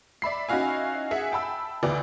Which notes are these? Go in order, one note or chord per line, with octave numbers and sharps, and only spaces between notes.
D5 E5 B5 C7
C#4 D#4 E4 F#4 F5 G#5
G#4 E5 F#5 G#5
G5 A5 B5 E6
D2 E3 D5 G5